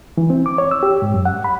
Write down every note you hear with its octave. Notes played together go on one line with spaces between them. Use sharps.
E3
C4
D6
C#5
E6
G4
G#2
F#2
F#5
B5